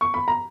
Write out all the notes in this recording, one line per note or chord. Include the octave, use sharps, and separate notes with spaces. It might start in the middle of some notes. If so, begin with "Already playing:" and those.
C#6
B5
A#5